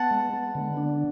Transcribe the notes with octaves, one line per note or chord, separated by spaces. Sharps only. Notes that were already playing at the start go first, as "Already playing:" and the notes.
Already playing: B3 F#5 A5
G#3
B3
D3
D4